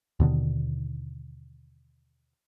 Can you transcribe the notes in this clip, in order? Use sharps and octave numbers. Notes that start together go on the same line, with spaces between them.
D#2 B2 D3 D#3